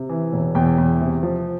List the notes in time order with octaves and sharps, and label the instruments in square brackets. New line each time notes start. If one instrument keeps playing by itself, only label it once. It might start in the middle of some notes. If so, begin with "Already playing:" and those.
Already playing: [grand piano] C3
E3
E1
E2 G5
E2
C3
F3